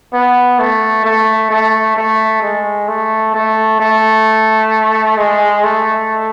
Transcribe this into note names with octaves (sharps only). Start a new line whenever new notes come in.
B3
A3
A3
A3
A3
G#3
A3
A3
A3
G#3
A3